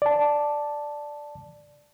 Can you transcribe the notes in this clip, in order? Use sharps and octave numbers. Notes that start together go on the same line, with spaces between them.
D5 A5